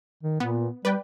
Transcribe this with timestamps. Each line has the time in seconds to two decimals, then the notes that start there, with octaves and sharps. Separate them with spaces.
0.23 D#3
0.40 A#2 B3
0.85 G3 B4 D5 G5